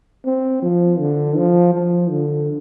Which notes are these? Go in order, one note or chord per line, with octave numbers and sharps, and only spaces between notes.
C4
F3
D3
F3
F3
D3